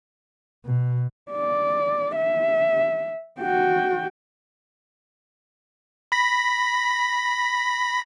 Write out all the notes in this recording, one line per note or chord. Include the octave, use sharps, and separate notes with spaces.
B2
D5
E5
F#4 G5
B5 A#6 B6